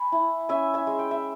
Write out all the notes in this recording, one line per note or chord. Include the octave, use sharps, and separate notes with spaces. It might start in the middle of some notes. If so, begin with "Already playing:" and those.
Already playing: G#5 B5 C#6
E4
C#4 E5 G#5
E5 G#5
G#3
G5
E5